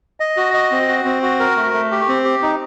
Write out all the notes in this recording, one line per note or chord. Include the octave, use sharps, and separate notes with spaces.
D#5
F#4
D#5
C4
F#4
C4
F#4
A#4
A3
A3
G4
C4
G4
D#4